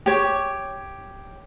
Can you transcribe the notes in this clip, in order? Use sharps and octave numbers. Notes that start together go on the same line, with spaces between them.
G4 C#5